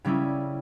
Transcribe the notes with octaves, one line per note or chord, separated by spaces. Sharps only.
C#3 G3 C#4 E4